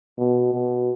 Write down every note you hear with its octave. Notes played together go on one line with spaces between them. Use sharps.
B2
B2